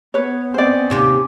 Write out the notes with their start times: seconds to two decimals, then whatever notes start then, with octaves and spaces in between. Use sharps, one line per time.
0.14 B3 B4 C#5
0.54 C4 C#4 C5 D5
0.90 D#2 C3 G4